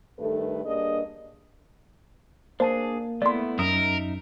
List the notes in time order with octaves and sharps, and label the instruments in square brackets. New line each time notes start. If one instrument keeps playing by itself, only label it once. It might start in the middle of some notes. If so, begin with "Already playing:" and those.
[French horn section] G2 D#3 A3 A4 B4
G2 A#3 D4 G#4 D#5
[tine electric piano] A#3 [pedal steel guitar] D4 G#4 [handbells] C5 A5
[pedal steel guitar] A3 B3 E4 [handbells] D5 C6
[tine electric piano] F#2 [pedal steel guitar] D#4 E5 [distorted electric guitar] A#4 [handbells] D#6